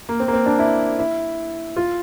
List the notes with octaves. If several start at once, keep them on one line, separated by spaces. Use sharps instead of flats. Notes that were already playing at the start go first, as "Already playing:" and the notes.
A#3
C4
A#3
C4
D4
E4
E4
F4